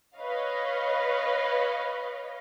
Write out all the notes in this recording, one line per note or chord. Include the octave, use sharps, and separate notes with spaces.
B4 C#5 D#5 F5